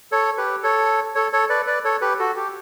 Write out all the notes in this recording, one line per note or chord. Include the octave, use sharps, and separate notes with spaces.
A4 C#5
G4 B4
A4 C#5
A4 C#5
A4 C#5
B4 D5
B4 D5
A4 C#5
G4 B4
F#4 A4
G4